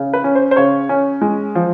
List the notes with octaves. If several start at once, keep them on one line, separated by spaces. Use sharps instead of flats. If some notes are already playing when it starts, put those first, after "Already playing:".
Already playing: C#3
B4
C#4
C5
C5
C#3 C#5
C#4
G#3
F3